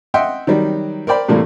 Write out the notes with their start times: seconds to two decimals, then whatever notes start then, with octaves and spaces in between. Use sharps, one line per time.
0.14 D#5 E5 F#5 G5 C6 E6
0.47 D#3 F#3 G3
1.07 A#4 C5 D5 G5 B5
1.29 A2 C3 E3 G3 A3 A#3